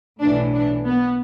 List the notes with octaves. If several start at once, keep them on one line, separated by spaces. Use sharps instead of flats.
B1 A2 E3 D4
D4
B3